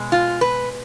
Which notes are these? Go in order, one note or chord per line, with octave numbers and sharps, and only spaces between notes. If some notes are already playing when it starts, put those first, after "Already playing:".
Already playing: B2 G#3
F4
B4